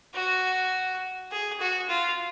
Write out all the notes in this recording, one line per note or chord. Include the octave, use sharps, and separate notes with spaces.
F#4
G#4
F#4
F4